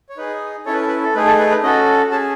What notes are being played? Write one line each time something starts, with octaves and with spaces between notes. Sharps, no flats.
C#5
D#4 G#4 B4
C#4 E4 A4 C#5
B4
A4
B4
A4
A3 D#4 G#4 B4
A4
B4
B4
C#4 F#4 A4 D#5
C#4 G#4 A5